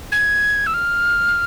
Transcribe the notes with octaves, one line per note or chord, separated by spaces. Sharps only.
G#6
E6
F6